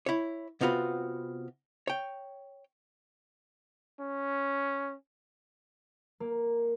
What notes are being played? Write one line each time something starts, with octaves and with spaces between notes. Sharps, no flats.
E4 C#5
C3 B3 C4 F4 F#4 B4
C#5 G5
C#4
A#3